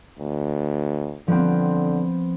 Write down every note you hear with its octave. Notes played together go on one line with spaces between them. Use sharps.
D2
D3 F3 B3 C4